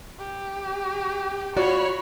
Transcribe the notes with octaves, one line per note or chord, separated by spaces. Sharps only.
G4
F4 F#4 C#5 D5 B5